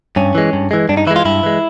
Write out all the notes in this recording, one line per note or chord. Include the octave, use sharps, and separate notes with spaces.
G2 C#4
E3 G#3
G2
E3 G#3
G2 D4
D#4
E3 G#3 E4
F4
G2 E4
E3 G#3